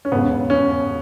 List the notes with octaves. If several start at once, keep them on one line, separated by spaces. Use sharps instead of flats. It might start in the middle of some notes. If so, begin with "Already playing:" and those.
C#4
E1 D#2 C#3 B3
C#4